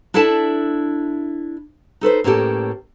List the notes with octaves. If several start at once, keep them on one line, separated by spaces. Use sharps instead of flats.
D4 E4 A4 E5 A5
D#4 A4 B4 C5
A2 A#3 B3 C#4 G4 A4